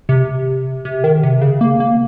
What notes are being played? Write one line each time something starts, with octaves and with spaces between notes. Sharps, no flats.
C3
C3
D#3
C3
C#3
A#3
A#3